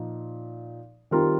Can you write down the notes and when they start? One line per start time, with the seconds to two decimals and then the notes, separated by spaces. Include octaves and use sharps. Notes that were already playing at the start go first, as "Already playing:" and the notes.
Already playing: A#2 F3 D#4
1.11 D#3 G3 C4 F4 A#4